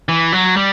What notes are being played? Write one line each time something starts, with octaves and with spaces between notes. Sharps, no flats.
E3
F#3
G3